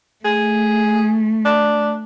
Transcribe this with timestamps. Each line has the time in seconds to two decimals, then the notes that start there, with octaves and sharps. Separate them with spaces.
0.25 A3 G#4
1.45 D4